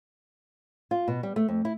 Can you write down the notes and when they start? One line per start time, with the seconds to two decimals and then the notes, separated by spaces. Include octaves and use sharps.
0.91 F4
1.08 B2
1.23 G3
1.36 A3
1.48 F2
1.65 E4